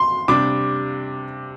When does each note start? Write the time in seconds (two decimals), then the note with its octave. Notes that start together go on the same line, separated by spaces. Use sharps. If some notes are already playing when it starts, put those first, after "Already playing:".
Already playing: C6
0.28 C3 G3 D4 D6